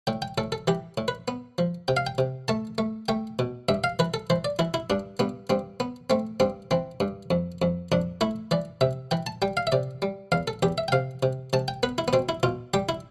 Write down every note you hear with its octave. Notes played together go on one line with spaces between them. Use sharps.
A2 G5
G5
A2 A4
A4
E3 G4
A2
B4
B3
F3
C3 G5
F5
G5
C3
A3 A5
A3
A3 G5
B2
G2 E5
F5
E3 B4
A4
E3 C5
D5
E3 E4
E4
G2 D4
G2 B3
G2 C4
B3
A3 C4
G2 C4
E3 C4
G2
F2
F2
F2 D4
A3 E4
E3 D5
C3 E5
E3 G5
A5
G3 G5
F5
E5
C3 D5
G3
E2 F5
A4
E2 G4
E5
G5
C3 F5
C3
C3 A5
G5
B3 B4
E4
B3
B2 C4
E4
B2 F4
G3 G4
E4